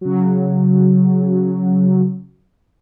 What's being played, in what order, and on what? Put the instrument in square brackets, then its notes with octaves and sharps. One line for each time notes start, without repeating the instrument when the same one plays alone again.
[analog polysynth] C#3 F#3